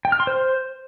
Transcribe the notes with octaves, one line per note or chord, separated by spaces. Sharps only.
G5
F6
C6
C5